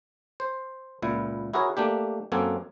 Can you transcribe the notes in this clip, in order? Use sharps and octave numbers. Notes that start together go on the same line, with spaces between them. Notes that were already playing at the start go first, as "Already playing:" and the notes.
C5
C#2 A#2 E4
E4 F#4 G#4 A#4 C#5
A3 A#3 D4 G4
F#2 A#3 C4 A4 F#5 G#5